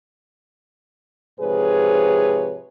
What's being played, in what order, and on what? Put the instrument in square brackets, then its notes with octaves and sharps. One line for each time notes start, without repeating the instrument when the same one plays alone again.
[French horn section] G#2 C3 F3 G#4 B4 C#5